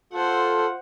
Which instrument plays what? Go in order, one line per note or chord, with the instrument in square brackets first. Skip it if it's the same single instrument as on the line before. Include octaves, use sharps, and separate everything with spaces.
[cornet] F4 [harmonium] A4 [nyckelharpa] C5 F#5